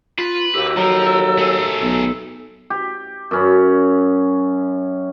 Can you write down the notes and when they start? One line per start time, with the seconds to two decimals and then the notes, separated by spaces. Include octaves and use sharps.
0.18 F4 B4
0.55 D#2 F#4 G4 E6
0.77 F3 F#3 A4 A#5
1.38 A3 G#4
1.82 B1
2.70 G4
3.31 F#2 C#4 B5